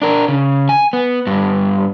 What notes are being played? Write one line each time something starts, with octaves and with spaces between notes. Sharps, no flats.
D4 A#4
C#3
G#5
B3
G2 B3